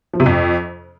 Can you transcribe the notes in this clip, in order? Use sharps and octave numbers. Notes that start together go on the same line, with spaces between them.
F3
C3
F2